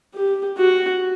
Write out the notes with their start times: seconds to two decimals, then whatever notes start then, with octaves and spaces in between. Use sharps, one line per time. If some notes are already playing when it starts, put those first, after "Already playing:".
0.14 G4
0.58 F#4